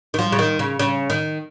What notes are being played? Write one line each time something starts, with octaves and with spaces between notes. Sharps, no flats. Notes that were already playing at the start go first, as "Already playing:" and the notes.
D#3
F3
C#3
D#3
C#3
C#3
D#3